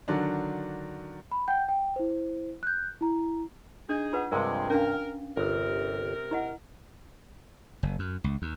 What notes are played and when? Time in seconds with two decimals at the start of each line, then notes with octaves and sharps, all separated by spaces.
0.08 D3 D#3 F#3 D4
1.32 B5
1.48 F#5 G5 G6
1.69 G5
1.96 E4 C5
2.63 F#6 G6
3.01 E4 A#5
3.89 D4 D#4 G#4
4.13 F4 B4 F#5
4.32 G2 C3 F3 G#3 A#4 G5
4.70 C#4 D4 A#4 F5
5.37 G1 C3 A#4
6.31 E4 D#5 F#5
7.83 F#1
7.99 F#2
8.24 C#2
8.42 D#2